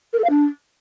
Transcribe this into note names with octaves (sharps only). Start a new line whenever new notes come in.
A#4
A4
F5
D4